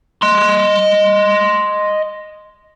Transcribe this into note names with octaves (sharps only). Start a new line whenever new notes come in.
D#5 C6